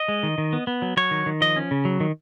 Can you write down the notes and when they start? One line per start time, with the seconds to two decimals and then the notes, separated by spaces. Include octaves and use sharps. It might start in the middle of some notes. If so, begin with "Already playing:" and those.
Already playing: D#5
0.08 G#3
0.23 D#3
0.38 D#3
0.53 B3
0.67 B3
0.82 F#3
0.97 F#3 C#5
1.11 D#3
1.26 D#3
1.41 F3 D#5
1.56 C#4
1.71 C#3
1.85 F#3
2.00 D#3